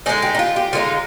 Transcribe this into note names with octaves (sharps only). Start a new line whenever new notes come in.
D3 G#3 C4 D#4 G#4
G4
D#4
F4
G4
D3 G#3 C4 D#4 F4